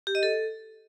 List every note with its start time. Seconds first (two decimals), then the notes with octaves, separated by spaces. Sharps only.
0.07 G4
0.15 D#5
0.23 A4